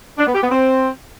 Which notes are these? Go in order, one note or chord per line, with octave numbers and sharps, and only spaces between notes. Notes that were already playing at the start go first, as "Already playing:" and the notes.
D4
B3
G4
B3
C4